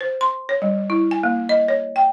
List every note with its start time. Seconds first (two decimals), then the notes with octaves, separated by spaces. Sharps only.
0.01 C5
0.21 C6
0.49 C#5
0.62 G3
0.90 E4
1.11 G#5
1.23 A#3
1.49 D#5
1.68 C#5
1.96 G5